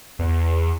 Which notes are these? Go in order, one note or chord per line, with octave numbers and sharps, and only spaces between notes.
E2